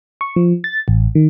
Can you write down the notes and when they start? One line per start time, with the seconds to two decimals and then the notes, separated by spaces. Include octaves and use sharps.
0.21 C#6
0.36 F3
0.64 A6
0.88 A1
1.15 D#3